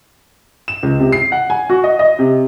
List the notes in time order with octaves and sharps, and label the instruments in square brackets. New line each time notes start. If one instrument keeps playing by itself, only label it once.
[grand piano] E7
C#2
C3
C7
F#5
G#5
F#4
D#5
D#5
C3